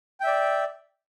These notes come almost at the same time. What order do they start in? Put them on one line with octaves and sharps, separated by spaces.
G5 E5 D5